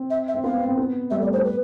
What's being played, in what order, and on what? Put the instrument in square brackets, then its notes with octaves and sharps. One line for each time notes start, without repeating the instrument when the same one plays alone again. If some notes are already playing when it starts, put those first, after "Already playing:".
Already playing: [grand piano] C4
[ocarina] E5
E5
[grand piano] C4
[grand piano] B3 [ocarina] F5
[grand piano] C4
C4
B3
[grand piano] G3 [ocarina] E5
[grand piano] A3 [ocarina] D5
[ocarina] C5
[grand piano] B3
[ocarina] B4